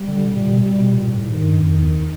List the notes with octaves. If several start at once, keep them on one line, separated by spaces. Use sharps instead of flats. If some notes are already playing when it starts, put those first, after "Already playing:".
Already playing: G3
D3
C3
A#2
B2
C3
B2
A#2
A2
G#2 D#3
G2
F2
E2